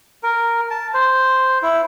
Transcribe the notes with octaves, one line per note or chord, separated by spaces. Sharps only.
A#4
A5
C5
E4